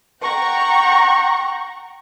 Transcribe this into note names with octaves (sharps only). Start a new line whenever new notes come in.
F#5 G5 A#5 C#6